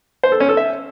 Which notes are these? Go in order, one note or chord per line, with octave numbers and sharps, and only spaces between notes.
C5
A4
C#4
A4
E5